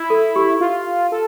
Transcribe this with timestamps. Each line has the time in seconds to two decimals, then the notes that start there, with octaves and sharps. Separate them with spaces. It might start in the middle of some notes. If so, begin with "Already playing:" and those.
Already playing: E4
0.10 A4
0.36 G4
0.61 F4
1.12 A4